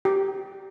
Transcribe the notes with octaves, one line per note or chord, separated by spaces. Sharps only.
G4